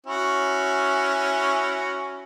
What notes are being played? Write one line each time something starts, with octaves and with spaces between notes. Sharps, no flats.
C#4 E4 F#4